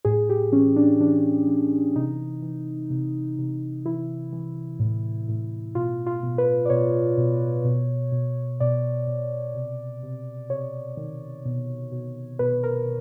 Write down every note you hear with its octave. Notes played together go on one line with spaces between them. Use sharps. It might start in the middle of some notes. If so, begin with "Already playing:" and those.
A2 G#4
G4
E3 C#4
D4
E3 D4
E3
C3 D#4
E3
C3
C3
E3 E4
E3
A2
A2
B2 F4
F4
B2
B4
D5
B2 C#5
B2
B2
B2
B2 D5
B2
C3
C3
C3 C#5
D#3
B2
B2
B2 B4
A#4